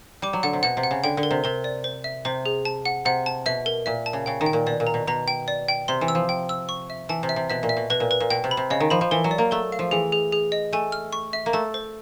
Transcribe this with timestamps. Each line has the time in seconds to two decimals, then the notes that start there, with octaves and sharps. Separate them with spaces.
0.22 G3 D6
0.33 F#3
0.43 D3 F#5
0.53 C3
0.63 B2 F#5
0.77 C3
0.83 F#5
0.91 C#3
1.04 D3 G5
1.17 D3
1.23 A#4
1.31 C3
1.44 C3 A#4
1.64 D5
1.84 C5
2.04 E5
2.25 C3 C5
2.46 G#4
2.65 A5
2.85 F#5
3.05 C3 F#5
3.26 A5
3.46 B2 E5
3.66 A#4
3.86 A#2 E5
4.06 A5
4.13 C#3
4.26 C#3 G5
4.41 D#3
4.46 G5
4.53 A#2
4.66 B2 D5
4.80 A#2
4.87 A#5
4.94 B2
5.07 B2 A#5
5.28 G5
5.48 D5
5.69 G5
5.88 C3 C6
6.01 E3
6.08 E6
6.15 F3
6.29 G5
6.49 E6
6.69 C#6
6.90 E5
7.09 E3 A5
7.23 C3
7.29 E5
7.36 C3
7.50 B2 E5
7.63 A#2
7.69 E5
7.77 B2
7.90 B2 B4
8.00 A#2
8.11 B4
8.20 A#2
8.30 B2 G5
8.44 C3
8.51 B5
8.57 C3
8.70 C#3 D#5
8.80 D#3
8.90 F3 B5
9.01 F3
9.11 E3 A#4
9.24 F#3
9.31 D5
9.38 A#3
9.51 A3 A#4
9.72 F5
9.79 F3
9.91 E3 G#4
10.12 G#4
10.32 G#4
10.52 D#5
10.73 A3 G#5
10.92 F6
11.13 C#6
11.33 E5
11.46 A#3
11.53 A3 A5
11.74 C5